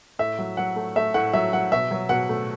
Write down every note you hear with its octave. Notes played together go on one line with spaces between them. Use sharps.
A2 E5
F#3
F#3 F#5
A3
A3 E5
A2 F#5
F#3 E5
F#3 F#5
B2 E5
F#3
B2 F#5
A3